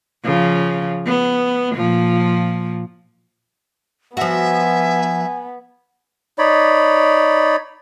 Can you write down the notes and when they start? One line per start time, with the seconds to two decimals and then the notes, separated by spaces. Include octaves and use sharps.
0.24 C#3 F3
1.06 B3
1.75 A#2 F3
4.17 F3 B3 F#4 E5 G#5
6.38 D#4 C#5 D5 B5